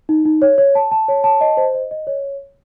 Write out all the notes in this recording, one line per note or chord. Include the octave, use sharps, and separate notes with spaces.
D#4
D#4
C#5
C#5
A5
A5
C#5
A5
D#5
C5
D#5
D#5
C#5